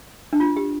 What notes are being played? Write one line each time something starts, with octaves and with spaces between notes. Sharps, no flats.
D4
F4
G4